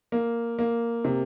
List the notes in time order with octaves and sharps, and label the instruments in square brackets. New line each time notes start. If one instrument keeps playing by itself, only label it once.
[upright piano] A#3
A#3
C3